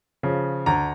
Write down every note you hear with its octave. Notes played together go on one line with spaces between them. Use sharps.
C#3 F3
D2 A#5